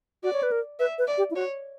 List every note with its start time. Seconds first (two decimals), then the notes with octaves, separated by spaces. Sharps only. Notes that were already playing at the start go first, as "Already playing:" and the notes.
0.23 F#4 D5
0.33 C#5
0.43 B4
0.52 A#4
0.79 B4 E5
0.98 B4
1.07 D5
1.18 G4
1.31 E4
1.36 F#4 C#5